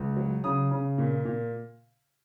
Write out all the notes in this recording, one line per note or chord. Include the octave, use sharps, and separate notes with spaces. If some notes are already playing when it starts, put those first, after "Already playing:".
Already playing: C#2
F#3
C#3 D#6
C#3
A#2
A#2